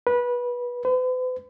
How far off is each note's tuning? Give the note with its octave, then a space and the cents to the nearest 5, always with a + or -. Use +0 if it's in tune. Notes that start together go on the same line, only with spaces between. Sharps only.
B4 -20
B4 +45